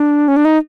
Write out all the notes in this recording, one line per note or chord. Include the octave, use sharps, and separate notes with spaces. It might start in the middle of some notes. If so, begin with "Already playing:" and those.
Already playing: D4
C#4
D4
D#4